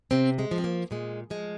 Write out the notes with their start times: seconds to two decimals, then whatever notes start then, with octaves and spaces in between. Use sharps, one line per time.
0.11 C3 C4
0.39 G#3
0.51 F3
0.58 C4
0.64 A#3
0.91 A#2 G#3
1.30 F3 G#3